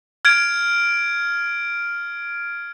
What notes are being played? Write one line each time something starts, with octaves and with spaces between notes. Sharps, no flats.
F6 G#6 D7